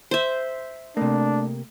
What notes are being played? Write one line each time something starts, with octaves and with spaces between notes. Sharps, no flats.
C5 E5
C3 A3 A#3 D4